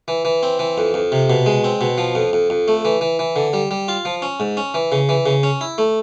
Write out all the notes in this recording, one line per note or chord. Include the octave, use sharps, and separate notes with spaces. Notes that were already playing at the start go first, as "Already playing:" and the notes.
E3
E3
C4
E3
F2
F2
C3
B2
G#3
C4
B2
F3
F2
F2
F2
A3
E3
E3
E3
D3
G3
G3
F4
F3
C#4
G#2
C#4
E3
C#3
E3
C#3
C#4
E4
A3